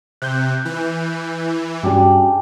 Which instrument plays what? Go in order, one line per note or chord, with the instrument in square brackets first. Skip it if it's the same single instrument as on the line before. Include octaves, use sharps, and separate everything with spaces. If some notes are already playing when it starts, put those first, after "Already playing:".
[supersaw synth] C3 [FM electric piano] F#6 G6
[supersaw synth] E3
[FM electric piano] G2 G3 [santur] G#3 D4 G4 [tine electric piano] C#4 F#4